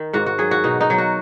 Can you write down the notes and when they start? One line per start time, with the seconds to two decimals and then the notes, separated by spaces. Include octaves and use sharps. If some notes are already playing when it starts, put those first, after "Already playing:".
Already playing: D#3 D#4
0.13 G#2 F#4
0.26 F#4
0.38 F#3 G#4
0.51 F#4
0.64 B2 D#4
0.81 D#4
0.90 F#3
0.98 F#4